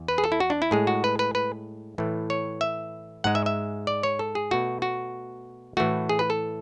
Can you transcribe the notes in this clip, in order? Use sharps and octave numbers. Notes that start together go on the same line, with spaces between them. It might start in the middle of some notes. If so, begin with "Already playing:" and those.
Already playing: E2
B4
G#4
A4
E4
F#4
D4
E4
A2 G#3 G#4
F#4
B4
B4
B4
A2 E3 A3
C#5
E5
G#2 G#3 F#5
E5
E5
D5
C#5
A4
G#4
B2 A3 F#4
F#4
A2 E3 A3 F#4
G#4
B4
A4